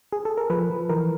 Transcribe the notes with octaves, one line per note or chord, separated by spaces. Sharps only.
G#4
A4
A#4
F3 B4
F3
E3 A#4